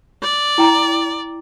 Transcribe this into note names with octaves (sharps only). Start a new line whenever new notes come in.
D5
E4 G5 A#5